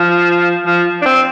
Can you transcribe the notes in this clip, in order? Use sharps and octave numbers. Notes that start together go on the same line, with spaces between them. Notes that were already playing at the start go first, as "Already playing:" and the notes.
Already playing: F3
F3
D4
C4